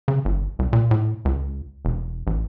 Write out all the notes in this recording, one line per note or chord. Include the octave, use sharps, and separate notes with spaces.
C#3
G1
C2
A#2
A2
C#2
E1
A1